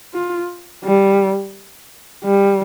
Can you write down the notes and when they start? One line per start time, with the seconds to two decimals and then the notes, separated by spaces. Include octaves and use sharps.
0.14 F4
0.84 G3
2.24 G3